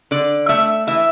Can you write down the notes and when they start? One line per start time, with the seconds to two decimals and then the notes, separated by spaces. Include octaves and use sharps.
0.11 D3 D5
0.49 A3 E5
0.87 E3 E5